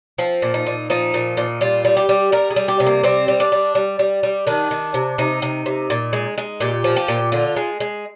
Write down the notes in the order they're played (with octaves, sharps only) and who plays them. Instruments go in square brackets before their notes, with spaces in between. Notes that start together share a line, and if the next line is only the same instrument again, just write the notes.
[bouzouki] F3 C4
A#2
D#4
A#2
F3 D#4
A#2
A#2
G3 F4
G3
G4
G3
G3 A#4
G#4
G3
G4
C3
A#3
G3 C4
G3
D4
G3
G3
G3
G3
D#3 D4
D#3
C3
C3 D#4
C3
C3
A#2
G#3
G#3
A#2 G4
F3
G4
A#2
D3 F4
G#3
G#3